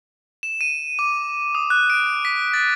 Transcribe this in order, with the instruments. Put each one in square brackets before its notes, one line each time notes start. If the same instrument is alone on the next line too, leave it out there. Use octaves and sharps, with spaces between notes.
[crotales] E7
D#7
D6
D#6
F#6
D7
B6
A6